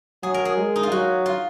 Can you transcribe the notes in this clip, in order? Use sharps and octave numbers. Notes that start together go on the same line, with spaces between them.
F#3 G#4
A#4
G#4
G#3
D#4
F4
F#3 F#4
F4